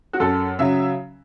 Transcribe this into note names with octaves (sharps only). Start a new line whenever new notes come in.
F#4
F#2 A4
C#3 F#3 E5